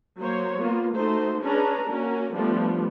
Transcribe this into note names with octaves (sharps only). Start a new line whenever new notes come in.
F#3 A#3 C5 C#5
A#3 B3 F4
A3 D#4 F#4 C5
C#4 D4 G#4 B4 A#5
A#3 C#4 F#4 A#4
F3 G3 A3 B3 D4